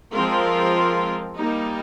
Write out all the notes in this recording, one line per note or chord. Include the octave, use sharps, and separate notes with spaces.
F3 G#3 C4 F4 A#4
G3 A#3 D#4